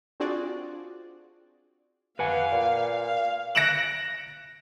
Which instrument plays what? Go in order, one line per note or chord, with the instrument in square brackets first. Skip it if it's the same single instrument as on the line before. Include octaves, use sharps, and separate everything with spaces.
[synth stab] C4 D4 F4 F#4 G#4 D5
[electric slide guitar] B4 F#5 G#5 [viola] F5
[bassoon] A#2
[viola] F5
[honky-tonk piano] F#6 A#6 C#7 D7 E7 F#7